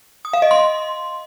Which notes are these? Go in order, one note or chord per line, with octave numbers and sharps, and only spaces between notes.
D#6
F5
D#5
C6